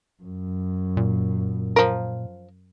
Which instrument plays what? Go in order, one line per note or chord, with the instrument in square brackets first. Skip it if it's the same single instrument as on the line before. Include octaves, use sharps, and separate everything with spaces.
[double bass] F#2
[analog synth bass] A#2
[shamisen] F3 A#4